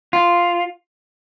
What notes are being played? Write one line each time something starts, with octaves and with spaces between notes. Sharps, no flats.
F4